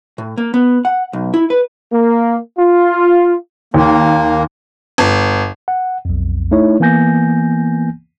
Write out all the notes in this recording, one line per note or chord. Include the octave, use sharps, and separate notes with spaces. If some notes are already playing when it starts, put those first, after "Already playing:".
A2
A#3
B3
F#5
B1
E4
B4
A#3
F4
D#2 A#3
G1
F#5
B1 F2
A3 D#4 E4 C#5
E3 A#3 B3 G#5 G6 A#6